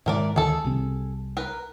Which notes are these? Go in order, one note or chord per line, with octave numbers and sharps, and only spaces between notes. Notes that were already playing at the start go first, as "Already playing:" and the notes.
G#2 D#3 E3 G#3 A#4 D5
D2 D#3 G#4 A4
C2 C3 C4
A#4 B4